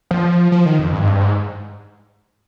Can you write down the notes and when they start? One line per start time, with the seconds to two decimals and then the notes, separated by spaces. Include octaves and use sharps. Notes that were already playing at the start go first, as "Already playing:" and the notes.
0.11 F3
0.52 F3
0.66 D#3
0.79 F2
0.93 G2
1.02 G#2
1.07 G2
1.21 G#2